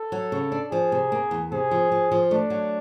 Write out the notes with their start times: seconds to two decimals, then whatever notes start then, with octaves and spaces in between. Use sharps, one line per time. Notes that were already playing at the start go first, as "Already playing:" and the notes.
Already playing: A4
0.12 F#3
0.32 C#3
0.52 D4
0.71 F3 G#4
0.92 C3
1.12 A#3
1.31 E2
1.52 C3 G#4
1.71 F3
1.92 F3
2.12 F3
2.31 A3 D4
2.50 F#3